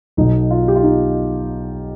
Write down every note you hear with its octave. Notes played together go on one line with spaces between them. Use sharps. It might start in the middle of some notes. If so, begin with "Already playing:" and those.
B1 B2 D#4
F4
G4
F4
D#4